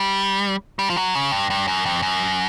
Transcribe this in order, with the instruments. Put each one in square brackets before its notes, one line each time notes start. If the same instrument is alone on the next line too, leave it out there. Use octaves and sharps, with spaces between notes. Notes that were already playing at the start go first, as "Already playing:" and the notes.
Already playing: [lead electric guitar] G3
G3
F3
F#3
C#3
G2
G2
F#2
F2
F#2